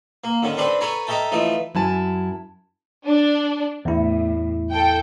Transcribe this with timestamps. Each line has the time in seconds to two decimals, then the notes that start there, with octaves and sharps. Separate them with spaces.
0.24 A#3
0.42 D3 D#3 C#4
0.57 C4 D4 A4 B4 C5
0.81 A4 B4 C#5 G#5 A#5
1.07 A4 A#4 D#5 E5 G5 A5
1.32 E3 F3 A3 D#4
1.75 F#2 E4 G#5 A5
3.05 D4
3.85 E2 A2 E4
4.71 A4 G5